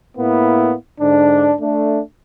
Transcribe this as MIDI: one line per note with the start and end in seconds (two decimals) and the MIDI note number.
0.17 0.74 45
0.17 0.74 58
0.17 0.74 59
0.17 0.74 64
1.00 1.53 44
1.00 1.53 50
1.00 1.53 62
1.61 2.00 57
1.61 2.00 62